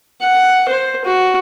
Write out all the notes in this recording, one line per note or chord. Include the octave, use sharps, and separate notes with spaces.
F#5
C5
F#4